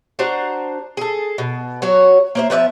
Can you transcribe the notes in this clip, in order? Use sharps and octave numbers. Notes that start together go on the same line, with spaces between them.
D4 F#4 C5 A#5
G#4 A4
B2
F#3 F#4 C#5
A#3 C5 E5
F3 B3 D5 E5